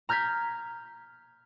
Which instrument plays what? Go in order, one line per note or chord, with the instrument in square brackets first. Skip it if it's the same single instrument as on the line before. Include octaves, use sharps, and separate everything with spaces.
[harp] A#5 F6 G6 G#6 B6